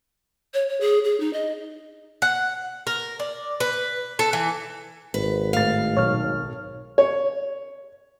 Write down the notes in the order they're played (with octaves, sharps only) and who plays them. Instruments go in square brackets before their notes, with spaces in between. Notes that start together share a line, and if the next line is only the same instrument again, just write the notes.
[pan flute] C#5
C#5
G#4
G#4
D#4
D#5
[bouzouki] F#5
A#4
D5
B4
A4
E3
[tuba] G#1 [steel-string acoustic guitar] B4
[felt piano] A2 A6 [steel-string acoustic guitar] F5
[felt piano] B1 [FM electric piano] C#5 F6
[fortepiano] C#5